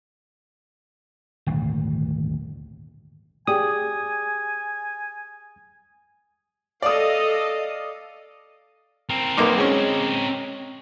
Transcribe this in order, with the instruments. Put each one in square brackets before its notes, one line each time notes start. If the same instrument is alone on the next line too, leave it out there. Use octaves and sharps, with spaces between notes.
[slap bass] D#1 G#1 D2
[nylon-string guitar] G4 G#4 D5 [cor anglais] G#5 [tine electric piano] D#6
[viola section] A4 D#5 [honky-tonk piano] D5 D#6 [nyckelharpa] F5
[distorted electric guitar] C4 A#4
[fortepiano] B1 A#3 D6
G#3 C#4